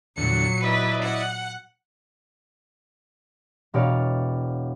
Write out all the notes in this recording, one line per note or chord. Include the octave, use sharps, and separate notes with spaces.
E2 A#2 D3 F#3 C#7
E4 B4 D5 D#5
F#5
E1 B2 G4 C#5 D5 F5